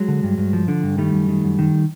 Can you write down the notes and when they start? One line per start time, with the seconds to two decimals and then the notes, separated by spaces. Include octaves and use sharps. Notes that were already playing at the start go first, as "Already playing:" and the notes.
Already playing: F#3 G#3
0.08 D3
0.23 G2
0.38 G2
0.53 F3
0.68 D3
0.83 G2
0.98 D#3 G3 A3
1.13 F#2
1.29 D#3
1.44 F#2
1.59 D#3